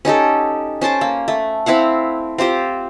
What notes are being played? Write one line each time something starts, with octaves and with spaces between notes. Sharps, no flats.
C#4 D#4 G4 A4
C#4 C5 A5 D6
A#3
A3
C4 E4 F5 F#5
C4 F4 G4 C5